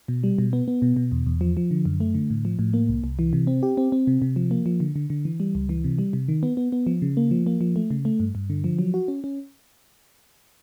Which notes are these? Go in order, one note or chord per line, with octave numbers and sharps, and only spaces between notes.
B2
G3
B2
B3
B3
B2
B2
E2
E2
F3
F3
D3
F#2
A3
D3
A2
F3
A2
A#3
C2
C2
E3
C3
C4
G4
C4
C4
C3
C3
F3
A#3
F3
D3
D3
D3
E3
G3
C#2
E3
C3
G3
C3
D#3
B3
B3
B3
F3
C#3
A#3
F3
A#3
F3
A3
C#3
A3
G2
G2
D3
F3
F#3
F#4
C#4
C#4